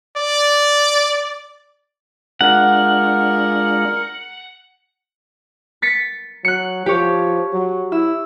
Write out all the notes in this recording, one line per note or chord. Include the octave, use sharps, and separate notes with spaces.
D5
G#3 D4 F4 A#4 F#5
A6 B6 C#7
F#3 F#6 C#7
F3 G4 C#5
F#3
E4 E6